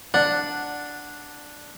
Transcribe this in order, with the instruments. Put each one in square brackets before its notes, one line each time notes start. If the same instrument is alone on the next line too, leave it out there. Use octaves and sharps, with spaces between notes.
[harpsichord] D4 [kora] F#5